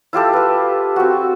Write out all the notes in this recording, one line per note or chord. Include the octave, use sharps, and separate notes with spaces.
E4 F4 G4 A4
G4 B4
C4 F#4